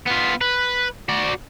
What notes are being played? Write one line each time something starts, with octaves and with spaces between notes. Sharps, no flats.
B3 F4
B4
F#4 D5